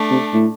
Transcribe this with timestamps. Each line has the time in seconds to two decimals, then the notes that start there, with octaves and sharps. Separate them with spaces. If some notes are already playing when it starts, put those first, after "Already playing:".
Already playing: A3 D4
0.11 C3
0.33 A2